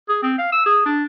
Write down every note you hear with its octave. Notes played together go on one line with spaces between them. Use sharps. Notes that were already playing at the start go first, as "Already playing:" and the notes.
G#4
C4
F5
E6
G#4
D4